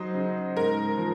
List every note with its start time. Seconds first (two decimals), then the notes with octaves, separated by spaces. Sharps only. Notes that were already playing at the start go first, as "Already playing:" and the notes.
Already playing: F#3 D#4 C5 D#5
0.15 C#3
0.56 G#2 A#4
0.98 F3